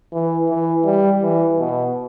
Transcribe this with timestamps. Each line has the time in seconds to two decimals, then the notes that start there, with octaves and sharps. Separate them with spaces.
0.13 E3
0.49 E3
0.85 G3
1.22 E3
1.59 B2